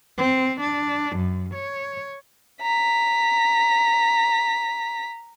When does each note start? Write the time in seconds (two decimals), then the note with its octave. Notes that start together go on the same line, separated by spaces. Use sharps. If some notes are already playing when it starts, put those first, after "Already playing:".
0.18 C4
0.61 D4
1.16 F#2
1.54 C#5
2.62 A#5 B6